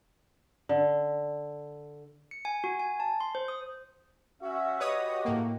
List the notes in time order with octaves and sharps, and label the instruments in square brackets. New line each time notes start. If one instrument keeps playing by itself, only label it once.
[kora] D3
[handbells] C#7
G#5
F#4
G#5
A5
C6
C5
D#6
[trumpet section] C#4 E5 [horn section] F#4
[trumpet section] G4 [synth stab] B4 C#5 D#6 [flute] D#5
[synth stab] A2 A#3